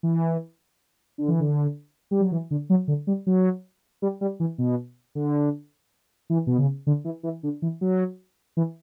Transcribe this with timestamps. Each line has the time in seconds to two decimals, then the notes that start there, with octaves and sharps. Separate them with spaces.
0.03 E3
1.18 D3
1.28 E3
1.40 D3
2.11 G3
2.20 F#3
2.32 E3
2.51 D3
2.70 F#3
2.88 D3
3.07 G3
3.27 F#3
4.02 G3
4.21 G3
4.40 E3
4.58 B2
5.15 D3
6.30 E3
6.47 B2
6.58 C#3
6.87 D3
7.04 E3
7.23 E3
7.43 D3
7.62 E3
7.81 F#3
8.57 E3